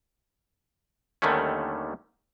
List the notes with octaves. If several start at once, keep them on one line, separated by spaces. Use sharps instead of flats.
D#2 D3 D#3 G3 A3 C#4